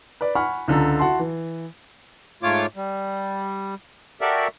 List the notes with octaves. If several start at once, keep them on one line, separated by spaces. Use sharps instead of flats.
B4 D5
F#5 G#5 B5 C#6 F6
C#2 D3 A4 A#5
E4 F#4 F#5 A5 C6
E3
G#2 A3 F4 C#5 D6
G3
F#4 G4 A4 A#4 D5 E5